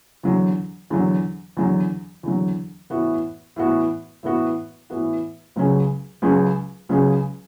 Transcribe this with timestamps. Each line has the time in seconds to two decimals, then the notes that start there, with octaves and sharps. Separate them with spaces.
0.23 E2 D3 F#3
0.90 E2 D3 F#3
1.57 E2 D3 F#3
2.23 E2 D3 F#3
2.90 A2 E3 B3 F#4
3.56 A2 E3 B3 F#4
4.23 A2 E3 B3 F#4
4.90 A2 E3 B3 F#4
5.56 C#2 C#3 F#3 C#4 G#4
6.22 C#2 C#3 F#3 C#4 G#4
6.89 C#2 C#3 F#3 C#4 G#4